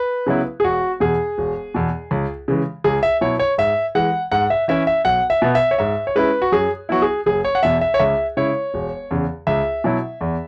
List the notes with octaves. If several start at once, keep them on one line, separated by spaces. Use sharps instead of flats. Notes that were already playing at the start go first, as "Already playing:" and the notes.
Already playing: B4
C#3 F#3 B3 E4
G#4
E1 F#4
E2 B2 G#4
E1
E2 B2
C#2
C#3 E3 G#3
C#2 G#4
E5
B2 F#3 E4 C#5
C#5
G#2 E5
E3 G#3 F#5
G#2 F#5
E5
E3 C#4 E4 E5
E5
B1 F#5
E5
B2 B3
E5
C#5
G#2 E5
C#5
G#3 C#4 E4 B4
F#4
F#2 G#4
F#3 B3 E4 F#4
G#4
F#1 G#4
C#5
F#5
E2 B2 E5
E5
C#5
C#2 E5
C#3 G#3 E4 C#5
E1
E2 C#3
C#2 E5
B2 F#3 E4
E2